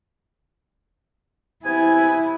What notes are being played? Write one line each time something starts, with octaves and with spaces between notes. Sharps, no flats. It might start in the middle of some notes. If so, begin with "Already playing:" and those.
C3 B3 E4 G#5